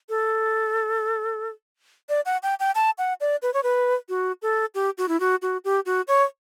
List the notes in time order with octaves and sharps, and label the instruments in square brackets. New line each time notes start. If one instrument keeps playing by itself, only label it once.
[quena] A4
D5
F#5
G5
G5
A5
F#5
D5
B4
C#5
B4
F#4
A4
G4
F#4
E4
F#4
F#4
G4
F#4
C#5